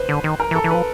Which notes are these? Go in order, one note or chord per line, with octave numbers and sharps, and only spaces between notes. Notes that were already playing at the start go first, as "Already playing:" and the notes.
Already playing: B4 C5
D3
D#3
A#4
E3
A4
E3
F3 B4